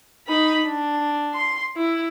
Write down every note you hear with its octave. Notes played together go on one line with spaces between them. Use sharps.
D#4 B5
D4
C6
E4